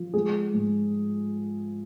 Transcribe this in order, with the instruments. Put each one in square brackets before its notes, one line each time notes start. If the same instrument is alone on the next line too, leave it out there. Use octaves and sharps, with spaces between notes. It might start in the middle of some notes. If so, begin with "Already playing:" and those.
Already playing: [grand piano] F3
G#3 G#4
G#2